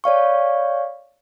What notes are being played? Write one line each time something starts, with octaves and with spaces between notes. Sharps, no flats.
C#5 D5 F5 C#6